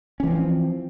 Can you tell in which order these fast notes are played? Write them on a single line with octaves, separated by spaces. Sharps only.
C#4 E3 C4 F3